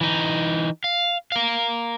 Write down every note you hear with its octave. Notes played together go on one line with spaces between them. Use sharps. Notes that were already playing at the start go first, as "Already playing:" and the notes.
E3 D#4
F5
A#4 F5